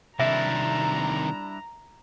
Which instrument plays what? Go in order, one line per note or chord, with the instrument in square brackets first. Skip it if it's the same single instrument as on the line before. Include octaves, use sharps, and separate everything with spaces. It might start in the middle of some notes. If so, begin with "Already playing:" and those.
[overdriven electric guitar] C3 D#3 [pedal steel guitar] G3 D4 E4 [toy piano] E5 [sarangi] A#5